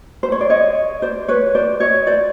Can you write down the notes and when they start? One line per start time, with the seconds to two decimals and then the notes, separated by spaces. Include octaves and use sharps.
0.23 C5
0.32 C#5
0.41 D5
0.50 C#5 D#5
1.02 C5 D5
1.28 B4 C#5
1.55 C5 D5
1.80 C#5 D#5
2.07 C5 D5